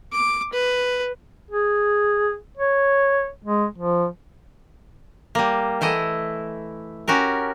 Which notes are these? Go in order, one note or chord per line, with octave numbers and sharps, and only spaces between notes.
D6
B4
G#4
C#5
G#3
F3
G3 A#3
E3 A3 E4 D#5
C#4 F#4 G4 A#4